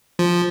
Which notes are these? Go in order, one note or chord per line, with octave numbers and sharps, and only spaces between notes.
F3